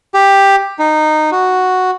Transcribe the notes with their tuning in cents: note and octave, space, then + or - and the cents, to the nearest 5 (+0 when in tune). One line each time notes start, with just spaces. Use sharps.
G4 +5
D#4 -15
F#4 +0